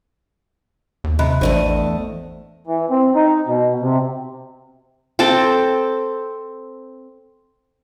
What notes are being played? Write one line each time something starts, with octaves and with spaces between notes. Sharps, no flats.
D#2
C3 D#5 B5 F#6
A1 E2 A3 D4 C5 D5 D#5
E3
C4
D#4
B2
C3
C4 A4 G5 A5